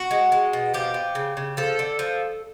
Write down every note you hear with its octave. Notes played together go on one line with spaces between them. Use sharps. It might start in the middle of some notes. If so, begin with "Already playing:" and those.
Already playing: F#4
G#3
G#3
B2
F3 G4
F3
C#3
C#3
F3 A4
D3
F3